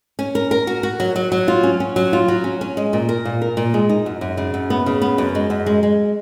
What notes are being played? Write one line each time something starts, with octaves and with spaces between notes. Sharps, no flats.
C#4
A#4
A#4
F#4
F#4
F#3
F#3
F#3
F4
C#4
C#4
F#3
F4
F#3
C#4
C#4
G#3
A#2
A#4
A#2
A#4
A#2
G#3
D#4
F#2
F#2
C#3
F#2
B3
C#3
B3
F#2
G#3
F#2
G#3
G#3